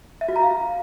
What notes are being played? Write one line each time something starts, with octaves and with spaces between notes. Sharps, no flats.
E5
F#4
A#5
F5